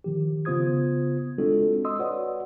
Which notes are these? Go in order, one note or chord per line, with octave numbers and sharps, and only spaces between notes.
D#3 F3 G4
C#3 B3 F4 C5 D#6 G#6
G#3 C4 D4 F4 F#4 A4
D#5 C6 D#6 E6
F#4 B4 C#5 D5 F#5